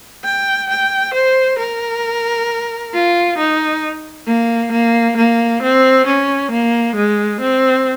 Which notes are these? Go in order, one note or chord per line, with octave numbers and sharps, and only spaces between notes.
G5
G5
C5
A#4
F4
D#4
A#3
A#3
A#3
C4
C#4
A#3
G#3
C4